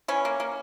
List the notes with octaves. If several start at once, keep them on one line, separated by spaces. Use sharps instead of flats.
E3 C#4
A#3
A#3